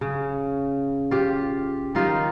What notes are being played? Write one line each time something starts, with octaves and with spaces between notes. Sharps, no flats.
C#3
F4 G4
D#3 D#4 F4 G4